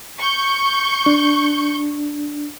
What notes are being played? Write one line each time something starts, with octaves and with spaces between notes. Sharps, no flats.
C#6 G6
D4